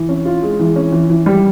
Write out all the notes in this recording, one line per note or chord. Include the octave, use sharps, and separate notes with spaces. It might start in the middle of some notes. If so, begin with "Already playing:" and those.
Already playing: E3
C#4
F4
G#3
E3
C#4
E3
E3
G3